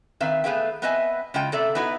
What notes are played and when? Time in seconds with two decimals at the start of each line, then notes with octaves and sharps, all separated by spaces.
0.20 D#3 C4 B4 E5 F5
0.44 A3 B3 G#4 B4 F5 G5
0.82 B3 C4 B4 D#5 E5 G#5
1.34 C#3 G#3 F4 G5
1.52 C3 A4 D5 E5
1.75 B3 D#4 E4 F#4 B4